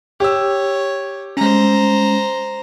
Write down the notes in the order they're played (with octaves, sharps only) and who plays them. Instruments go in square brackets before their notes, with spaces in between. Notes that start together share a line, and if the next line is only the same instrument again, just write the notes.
[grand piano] G4 E6 [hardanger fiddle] C#5
[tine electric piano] G#3 C#4 [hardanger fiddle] C5 A#5